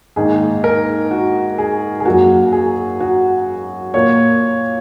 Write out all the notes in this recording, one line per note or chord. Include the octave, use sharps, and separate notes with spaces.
G#2 D#3 A#3 G#4
A#4
F#4
G#4
G#4
F#2 F#3 A#3 F#4
G#4
F#4
A#2 A#3 C#5